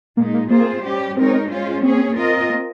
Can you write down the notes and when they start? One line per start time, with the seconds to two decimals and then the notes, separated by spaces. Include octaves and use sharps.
0.17 A#2 G#3 A#3 D#4
0.34 A#3
0.50 A#3 C4 F4 G#4 C5
0.84 G3 C#4 G4
1.17 G#3 C4 D#4 A#4 C#5
1.50 G#3 C#4 F4 C5
1.83 A#3 C4 C#4 G#4 C#5
2.17 C4 F4 A#4 D#5
2.50 A#3